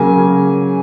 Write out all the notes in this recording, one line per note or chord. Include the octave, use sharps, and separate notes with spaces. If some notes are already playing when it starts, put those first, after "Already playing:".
Already playing: C#3 F#3 A#3 G#5